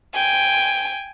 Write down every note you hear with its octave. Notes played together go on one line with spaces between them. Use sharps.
G5 G#5